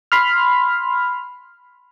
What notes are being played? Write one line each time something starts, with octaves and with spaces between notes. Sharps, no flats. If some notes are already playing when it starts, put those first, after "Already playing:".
B5 C6 F6